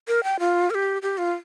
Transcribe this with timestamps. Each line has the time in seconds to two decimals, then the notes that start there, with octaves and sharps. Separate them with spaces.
0.08 A#4
0.24 G5
0.40 F4
0.70 A#4
0.75 G4
1.02 G4
1.18 F4